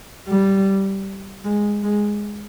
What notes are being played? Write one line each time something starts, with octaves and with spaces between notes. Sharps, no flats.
G3
G#3
G#3